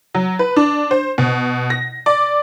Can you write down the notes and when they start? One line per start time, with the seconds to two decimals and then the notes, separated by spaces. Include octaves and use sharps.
0.15 F#3
0.39 B4
0.56 D4
0.91 C5
1.18 B2
1.70 A#6
2.06 D5